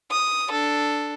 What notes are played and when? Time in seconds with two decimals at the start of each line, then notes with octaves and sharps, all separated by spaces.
0.11 D#6
0.51 D4 A4